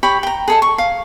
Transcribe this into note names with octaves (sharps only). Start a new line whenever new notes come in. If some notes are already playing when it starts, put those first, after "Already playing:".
G4 C#5 B5
G5 A#5
G#4 A4 D#5
C#6
F5